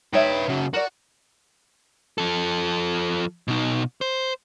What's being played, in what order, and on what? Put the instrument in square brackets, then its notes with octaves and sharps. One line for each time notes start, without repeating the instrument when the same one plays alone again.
[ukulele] D#4 C#5 E5 [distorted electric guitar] B4 G5
[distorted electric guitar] C#3 F#3
[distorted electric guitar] F#4 [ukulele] A#4 D5
[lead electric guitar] F3 A4
B2 D#4
C5